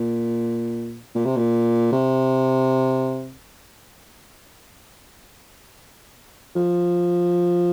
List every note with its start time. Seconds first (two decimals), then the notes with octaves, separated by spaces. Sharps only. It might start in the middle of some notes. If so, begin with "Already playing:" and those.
Already playing: A#2
1.15 A#2
1.25 C3
1.37 A#2
1.92 C3
6.55 F3